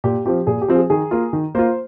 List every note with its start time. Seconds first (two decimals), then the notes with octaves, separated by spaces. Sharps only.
0.04 A#2 G4
0.26 F3 C4 F4 G4
0.47 A#2 G#4
0.62 G4
0.68 F3 C4 F4
0.76 G#4
0.90 D#3 G#4
1.11 A#3 F4
1.33 D#3
1.55 A#3 F4 C5